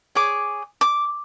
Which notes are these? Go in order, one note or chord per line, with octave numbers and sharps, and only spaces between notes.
G#4 C#5 D6
D6